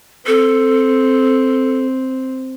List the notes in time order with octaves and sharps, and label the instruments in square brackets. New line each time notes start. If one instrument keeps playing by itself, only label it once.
[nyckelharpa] C4 [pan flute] A4